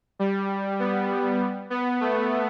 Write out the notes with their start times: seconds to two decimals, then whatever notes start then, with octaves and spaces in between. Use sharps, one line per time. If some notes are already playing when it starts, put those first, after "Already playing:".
0.19 G3
0.80 B3
1.70 B3
2.01 A3